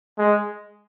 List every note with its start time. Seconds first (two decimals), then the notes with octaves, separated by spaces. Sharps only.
0.18 G#3